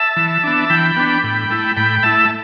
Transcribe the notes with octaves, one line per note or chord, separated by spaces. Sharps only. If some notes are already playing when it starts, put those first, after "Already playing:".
Already playing: E5 A5
E3
B3 D4
E3 G5 B5
B3 D4
A2
A3 E4
A2 G5 B5
B5
A3 E4 E5 A5
A5